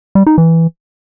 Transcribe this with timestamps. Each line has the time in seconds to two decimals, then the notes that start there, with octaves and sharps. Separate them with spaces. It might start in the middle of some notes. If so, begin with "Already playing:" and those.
0.15 G3
0.27 D#4
0.38 E3